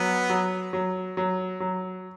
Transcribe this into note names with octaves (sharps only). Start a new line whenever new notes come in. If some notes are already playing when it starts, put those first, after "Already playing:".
Already playing: F#3 B3
F#3
F#3
F#3
F#3